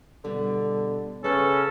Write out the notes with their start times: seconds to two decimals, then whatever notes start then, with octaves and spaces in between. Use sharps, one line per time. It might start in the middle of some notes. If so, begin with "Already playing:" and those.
0.24 B2 D3 G3
1.24 C#3 C#4 A4 B4 A5